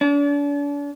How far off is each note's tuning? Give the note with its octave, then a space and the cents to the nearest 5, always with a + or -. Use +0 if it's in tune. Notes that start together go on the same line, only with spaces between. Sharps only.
D4 -40